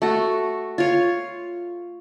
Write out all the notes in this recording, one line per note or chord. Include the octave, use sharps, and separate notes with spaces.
A3 F#4
F4 C#5